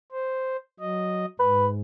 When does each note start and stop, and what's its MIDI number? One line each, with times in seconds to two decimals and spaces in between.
0.12 0.56 72
0.80 1.26 54
0.80 1.26 75
1.40 1.81 44
1.40 1.67 71